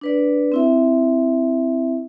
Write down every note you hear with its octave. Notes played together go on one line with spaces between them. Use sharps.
D4 B4 D5
C4 E4 E5